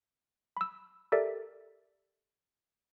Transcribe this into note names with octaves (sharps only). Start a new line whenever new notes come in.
B5 E6
G4 A4 A#4 D5 E5